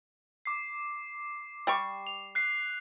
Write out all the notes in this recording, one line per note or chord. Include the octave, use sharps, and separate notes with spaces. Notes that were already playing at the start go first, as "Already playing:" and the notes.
D6 C7
G3 G4 C#6
F7
F#6 C7